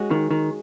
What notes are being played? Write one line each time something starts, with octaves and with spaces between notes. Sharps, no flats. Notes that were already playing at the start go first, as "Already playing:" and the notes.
Already playing: G#3 C#4 F#4
D#3
D#3